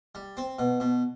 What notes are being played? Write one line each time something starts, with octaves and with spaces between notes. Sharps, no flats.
G3
C4
B2
B2